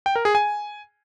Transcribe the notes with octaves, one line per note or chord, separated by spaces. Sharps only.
G5
A#4
G#4
G#5